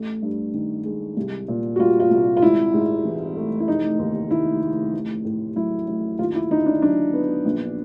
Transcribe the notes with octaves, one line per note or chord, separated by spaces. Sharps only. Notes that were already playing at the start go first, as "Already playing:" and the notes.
Already playing: A1 A3
G2
D#3
G#3
C2
A#2
F#4
G3 F4
F4
C2
F4
G#1 E4
G#2
E3
A3
E4
F1 D#4
D#2
D#3 E4
F1
A1
A2
F#3 E4
A1
D#2 F4
E4
D3 D#4
D4
F#3 D4
B3
A#1